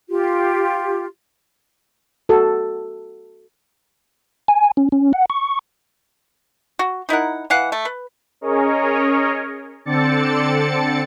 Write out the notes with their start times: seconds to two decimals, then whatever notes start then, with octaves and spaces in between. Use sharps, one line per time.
0.09 F4 G4
2.29 F#4 A4
4.48 G#5
4.77 C#4
4.92 C#4
5.13 F#5
5.30 C#6
6.79 F#4
7.09 D#4 E4 A#4 F#5
7.50 E3 F5 F#5
7.72 A3
7.85 B4
8.41 C#4 G#4 A#4 C#5 D#5
9.85 D3 C4 A4 D5 A6 C#7